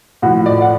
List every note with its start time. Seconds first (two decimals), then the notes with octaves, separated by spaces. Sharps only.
0.22 A2 F#4
0.26 F3
0.46 D5
0.62 F#5